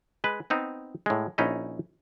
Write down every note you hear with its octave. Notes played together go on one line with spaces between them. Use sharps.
G#3 B4
B3 C4 D#4
A2 G#3
A#1 C#4 D#4 E4 D#5